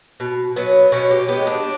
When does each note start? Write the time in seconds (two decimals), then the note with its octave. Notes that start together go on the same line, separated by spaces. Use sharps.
0.20 B2
0.56 F#3 B3
0.92 B2 C#4
1.11 G4
1.28 G#3 B3 G4
1.47 D4